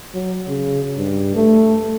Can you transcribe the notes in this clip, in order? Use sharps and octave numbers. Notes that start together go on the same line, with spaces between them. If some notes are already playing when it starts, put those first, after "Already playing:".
F#3
C#3
G2
A3